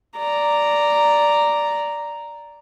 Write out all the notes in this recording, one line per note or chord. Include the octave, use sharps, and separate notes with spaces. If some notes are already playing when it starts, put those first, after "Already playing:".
D5 A#5